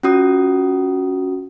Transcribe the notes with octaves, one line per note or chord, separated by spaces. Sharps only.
C#4 F4 F#4 D#6